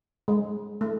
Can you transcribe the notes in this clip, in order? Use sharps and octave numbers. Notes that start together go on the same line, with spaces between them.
G#3
A3